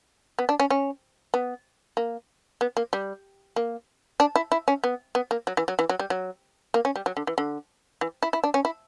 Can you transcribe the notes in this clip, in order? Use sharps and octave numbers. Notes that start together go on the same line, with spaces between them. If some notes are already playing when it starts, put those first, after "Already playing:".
B3
D4
C#4
C#4
B3
A#3
B3
A#3
G3
A#3
D4
E4
E4
C#4
B3
B3
A#3
F#3
E3
F#3
E3
F#3
G3
F#3
A#3
C#4
G3
F#3
D3
E3
D3
E3
E4
E4
D4
C#4
E4